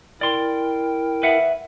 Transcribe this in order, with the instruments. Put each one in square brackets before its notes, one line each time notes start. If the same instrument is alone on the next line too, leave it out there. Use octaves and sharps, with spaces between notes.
[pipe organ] E4 A#4 G5 [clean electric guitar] D5 C6
[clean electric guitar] B4 E5 F#5